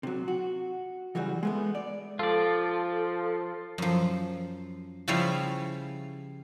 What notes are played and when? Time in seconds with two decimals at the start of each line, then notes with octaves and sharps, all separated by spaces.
0.03 C3 F#3
0.28 F#4
1.15 C#3 E3 F#3 G3 F#4
1.43 G#3 A3 B3
1.75 D5
2.19 F3 F4 A4 D5
3.78 F#2 F3
5.08 C#3 F3 G3 E4 F4 C#5